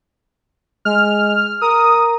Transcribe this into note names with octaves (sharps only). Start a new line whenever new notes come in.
G#3 F6
A#4 D#6